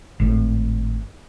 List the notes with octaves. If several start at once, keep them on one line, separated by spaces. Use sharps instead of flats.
G#1 A2